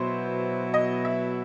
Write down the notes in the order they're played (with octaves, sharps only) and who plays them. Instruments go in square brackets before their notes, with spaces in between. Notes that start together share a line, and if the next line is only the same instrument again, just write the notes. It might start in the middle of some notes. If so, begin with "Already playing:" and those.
Already playing: [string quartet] B2 F#3 B3 E4 [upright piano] C5
[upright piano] D#5
E5